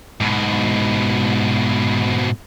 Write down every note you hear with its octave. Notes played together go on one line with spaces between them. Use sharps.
G#2 B2